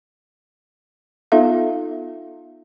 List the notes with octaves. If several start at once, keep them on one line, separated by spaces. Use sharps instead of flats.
B3 D#4 F4 A4 E5 F5